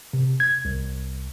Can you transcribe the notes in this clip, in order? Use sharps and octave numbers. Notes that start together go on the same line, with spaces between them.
C3
G#6
C2